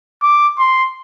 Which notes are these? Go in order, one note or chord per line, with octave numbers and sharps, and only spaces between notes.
D6
C6